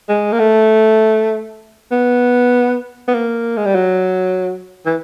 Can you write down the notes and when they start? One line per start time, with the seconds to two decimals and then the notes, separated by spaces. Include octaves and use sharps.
0.09 G#3
0.32 A#3
0.39 A3
1.91 B3
3.08 B3
3.14 A#3
3.57 G#3
3.65 G3
3.75 F#3
4.85 E3